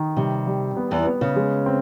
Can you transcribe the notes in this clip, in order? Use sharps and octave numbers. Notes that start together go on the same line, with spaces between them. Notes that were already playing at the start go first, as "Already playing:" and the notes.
Already playing: D#3
C3 G3
G3
B3
E2 E3
B3
C#3
G#3
C4